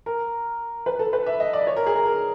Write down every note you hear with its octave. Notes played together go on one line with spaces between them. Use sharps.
A#4
B4
A4
B4
E5
D#5
D5
C#5
A#4
G#4
A#4
A#4